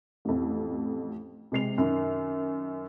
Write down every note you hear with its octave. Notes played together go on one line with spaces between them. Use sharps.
A1 F2
C3 G#3 C7 F7
F#2 D#3